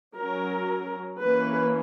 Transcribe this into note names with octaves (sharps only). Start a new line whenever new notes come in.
F#3 C#4 A#4
E3 A#3 C#4 B4